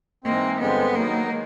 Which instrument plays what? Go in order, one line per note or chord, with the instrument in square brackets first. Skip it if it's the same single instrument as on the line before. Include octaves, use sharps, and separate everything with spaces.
[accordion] G#2 E3 G#3 C4 [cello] A#3
[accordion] G2 D3 F3 G#3 C4 [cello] B3
[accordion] D#3 F#3 B3 D#4 [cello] A#3
[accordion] D#3 G#3